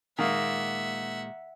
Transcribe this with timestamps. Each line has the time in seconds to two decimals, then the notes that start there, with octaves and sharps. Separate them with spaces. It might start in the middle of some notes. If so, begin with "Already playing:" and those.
0.19 A#2 D#3 G#3 A#3 E5 F#5